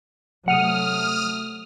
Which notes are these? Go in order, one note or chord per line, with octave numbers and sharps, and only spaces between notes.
C3 F#3 A3 F#5 D#6 F6